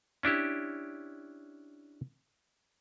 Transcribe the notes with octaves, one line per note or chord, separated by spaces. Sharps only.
C#4 D4 E4 G4